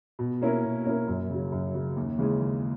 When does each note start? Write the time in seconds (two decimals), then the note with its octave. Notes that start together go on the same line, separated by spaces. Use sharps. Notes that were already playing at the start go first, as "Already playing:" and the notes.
0.19 B2
0.41 A#3 C#4 E4 A#4
0.63 B2
0.85 A#3 C#4 E4 A#4
1.08 F#2
1.30 C#3 F#3
1.52 F#2
1.74 C#3 F#3
1.96 D#2
2.19 C#3 E3 G#3
2.41 D#2